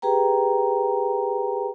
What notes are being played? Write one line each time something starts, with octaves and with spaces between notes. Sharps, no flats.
G4 G#4 B4 G5 A#5